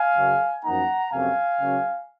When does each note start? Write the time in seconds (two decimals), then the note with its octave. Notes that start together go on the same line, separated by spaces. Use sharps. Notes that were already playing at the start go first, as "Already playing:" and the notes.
Already playing: F5 G#5
0.16 F#2 C#3 F#3
0.64 F#2 F3 A#3 D#4 F#5 A#5
1.12 F2 C3 F#3 A#3 C#4 F5 G#5
1.60 C#3 F#3 A#3 C#4